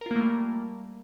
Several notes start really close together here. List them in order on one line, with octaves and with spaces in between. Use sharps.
A#4 F4 A#3 A3 G3